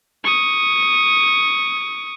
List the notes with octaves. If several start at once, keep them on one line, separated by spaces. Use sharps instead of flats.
C#6 D#6